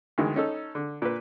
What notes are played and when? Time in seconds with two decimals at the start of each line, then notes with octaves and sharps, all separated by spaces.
0.18 D2 D#3 E3 G#3
0.36 C#4 D#4 A4
0.75 D3
1.02 A#2 B4